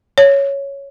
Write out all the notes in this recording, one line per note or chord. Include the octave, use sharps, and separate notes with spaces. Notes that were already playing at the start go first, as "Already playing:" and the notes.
C#5